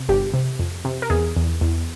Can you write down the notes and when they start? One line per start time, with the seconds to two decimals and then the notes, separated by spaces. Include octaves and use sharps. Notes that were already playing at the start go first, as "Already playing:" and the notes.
Already playing: C3
0.09 G1 G4
0.34 C3
0.59 F2
0.85 C3
1.02 A#4
1.10 E2 G#4
1.36 E2
1.61 E2